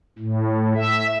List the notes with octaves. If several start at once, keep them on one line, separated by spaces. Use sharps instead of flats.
A2
E5